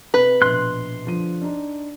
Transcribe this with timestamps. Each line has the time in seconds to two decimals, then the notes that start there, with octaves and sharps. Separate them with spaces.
0.14 C3 B4
0.42 A#1 B2 C6 F#6
1.05 D3 F3 D#7
1.42 D4 D#4